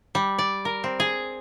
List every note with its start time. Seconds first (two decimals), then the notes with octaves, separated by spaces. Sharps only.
0.15 G3
0.38 D5
0.65 A#4
0.84 C4
1.00 G#4